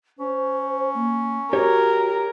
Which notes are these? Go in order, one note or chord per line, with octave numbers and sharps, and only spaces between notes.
C#4 C5
A#3
F#4 G4 A#4 C#5